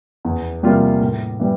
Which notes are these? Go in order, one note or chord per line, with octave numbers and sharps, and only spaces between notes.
E2
C3 G3 A#3 F4
A2
E3 G3